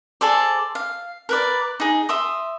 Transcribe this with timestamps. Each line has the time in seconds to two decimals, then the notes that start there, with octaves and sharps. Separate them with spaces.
0.21 G#4 A4 C5 D5
0.75 F5
1.29 A#4 B4 D5
1.80 D#4 G#4
2.09 E5 C6 D#6